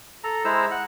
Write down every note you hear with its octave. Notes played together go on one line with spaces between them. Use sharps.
A4 A#5
G#3 E4 C5 A#5 E6
F#5 F#6